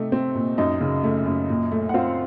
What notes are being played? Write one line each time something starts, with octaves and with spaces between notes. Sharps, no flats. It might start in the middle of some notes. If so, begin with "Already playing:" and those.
Already playing: C3 A3 D#4 D#5
C4
A#2
F#2 D#4 D#5
C#3
A3
F#2
A#2
A3
F#5
C4 F4 F5